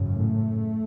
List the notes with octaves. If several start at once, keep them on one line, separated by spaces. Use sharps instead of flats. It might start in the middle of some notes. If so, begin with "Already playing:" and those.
Already playing: G#1 F#2 C#3
A2 A3